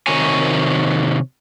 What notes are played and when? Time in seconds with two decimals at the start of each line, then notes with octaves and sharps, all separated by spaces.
0.07 C3 D#3 F#4 A#4 C#5 G#5